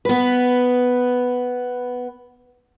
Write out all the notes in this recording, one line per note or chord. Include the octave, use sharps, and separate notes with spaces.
B3 B4